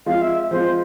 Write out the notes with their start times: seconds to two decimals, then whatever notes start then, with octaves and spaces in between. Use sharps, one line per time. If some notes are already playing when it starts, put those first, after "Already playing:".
0.06 F3 G#3 C4 F4 F5
0.21 E5
0.51 F3 G#3 C4 F4 C5